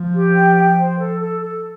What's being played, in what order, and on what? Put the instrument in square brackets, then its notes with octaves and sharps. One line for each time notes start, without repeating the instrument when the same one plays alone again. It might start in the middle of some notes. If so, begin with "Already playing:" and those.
Already playing: [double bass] F3
[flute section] G4
G5
G5
C5
A4
A4
A4